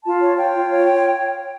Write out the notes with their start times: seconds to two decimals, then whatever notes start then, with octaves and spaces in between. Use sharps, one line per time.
0.04 F4 A5
0.21 C#5
0.38 C#5 G5
0.54 F4
0.71 C#5